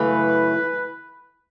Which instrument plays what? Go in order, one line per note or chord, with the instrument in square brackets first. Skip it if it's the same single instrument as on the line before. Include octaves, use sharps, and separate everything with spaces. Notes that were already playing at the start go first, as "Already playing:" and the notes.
Already playing: [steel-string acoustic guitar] F#2 C#3 E3 A3 [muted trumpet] B4